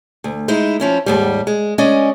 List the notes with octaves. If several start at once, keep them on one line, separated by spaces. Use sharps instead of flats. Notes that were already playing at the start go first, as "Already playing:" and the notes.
D2
G#3 D#4 E4
F3 C#4 E4
D#2 G#2 G3
G#3
G#3 C#4 D5 D#5